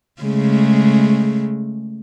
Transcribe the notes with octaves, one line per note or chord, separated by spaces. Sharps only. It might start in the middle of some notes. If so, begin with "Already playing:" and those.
C#3 G#3 A3